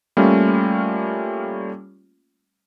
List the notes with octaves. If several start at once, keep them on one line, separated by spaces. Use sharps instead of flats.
G3 A3 A#3 C#4 F4